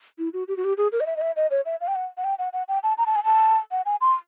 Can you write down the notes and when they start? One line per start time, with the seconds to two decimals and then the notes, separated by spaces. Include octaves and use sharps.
0.18 E4
0.33 F#4
0.48 G4
0.57 F#4
0.64 G4
0.77 G#4
0.92 A#4
1.00 D#5
1.06 E5
1.16 D#5
1.21 E5
1.36 D#5
1.51 C#5
1.65 E5
1.81 F5
1.87 G5
1.95 F#5
2.17 F#5
2.24 G5
2.39 F#5
2.53 F#5
2.68 G5
2.83 A5
2.98 A#5
3.06 A5
3.15 G#5
3.24 A5
3.71 F#5
3.86 G#5
4.01 C6